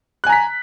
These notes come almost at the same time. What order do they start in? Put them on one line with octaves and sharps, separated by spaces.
F#6 G#5 A#5 B6